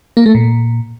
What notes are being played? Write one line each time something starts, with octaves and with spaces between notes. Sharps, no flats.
A#3
A3
A#2